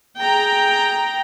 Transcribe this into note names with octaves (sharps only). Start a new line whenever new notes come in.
G#4 G5 A#5